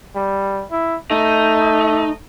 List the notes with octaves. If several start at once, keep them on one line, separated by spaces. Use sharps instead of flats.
G3
E4
A3 D#4